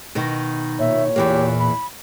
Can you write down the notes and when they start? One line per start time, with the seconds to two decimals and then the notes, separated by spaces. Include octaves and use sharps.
0.15 B2 D#3 D#4
0.80 A#2 C#5 E5
1.16 E2 E3 A#3 G4
1.59 B5